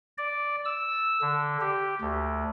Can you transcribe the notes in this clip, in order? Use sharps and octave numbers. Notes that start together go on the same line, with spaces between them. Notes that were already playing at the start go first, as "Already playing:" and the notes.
D5
E6
D3
G4
D2